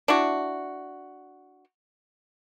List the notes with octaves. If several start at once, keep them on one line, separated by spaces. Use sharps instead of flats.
D4 E4 F#4